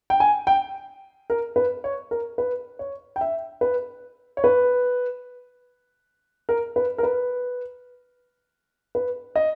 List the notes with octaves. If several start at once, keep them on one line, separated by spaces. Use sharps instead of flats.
G5
G#5
G5
A#4
B4
C#5
A#4
B4
C#5
G5
E5
B4
C#5
B4
A#4
B4
A#4
B4
B4
D#5